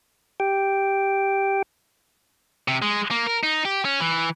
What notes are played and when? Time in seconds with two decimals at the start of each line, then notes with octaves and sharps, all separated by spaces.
0.40 G4 G5
2.68 C3
2.82 G#3
3.11 A#3
3.27 A#4
3.43 D#4
3.65 G4
3.85 C#4
4.00 E3